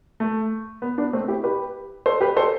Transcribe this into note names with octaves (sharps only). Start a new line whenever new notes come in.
A3
B3
B3 D4
A3 C4
E4 G4
G4 B4
A4 C5
G4 B4
A4 C5